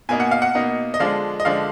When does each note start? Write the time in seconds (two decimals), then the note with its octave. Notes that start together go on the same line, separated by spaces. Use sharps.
0.09 B2 A#3 D#4 G#5
0.20 F#5
0.31 F5
0.42 F#5
0.55 B2 A#3 D#4
0.94 D#5
1.00 D3 F3 G#3 D4 F5
1.40 D#5
1.45 D3 F3 G#3 D4 F5